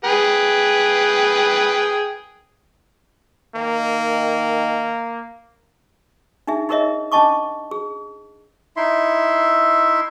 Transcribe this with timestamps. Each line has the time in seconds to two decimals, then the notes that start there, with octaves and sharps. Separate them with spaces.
0.04 G#4 B4 G5
3.56 D#3 A#3
6.47 D4 D#4 G#4 E5
6.69 D#4 G#4 A#4 C#5 D#5 E5
7.12 C#4 D4 D#5 A5 C#6 D6
7.71 G#4
8.77 D#4 E4 E5 C6